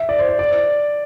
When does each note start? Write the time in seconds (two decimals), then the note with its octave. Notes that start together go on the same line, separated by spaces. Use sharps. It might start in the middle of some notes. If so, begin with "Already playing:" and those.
Already playing: E5
0.09 D5
0.19 C5
0.29 D5
0.39 D5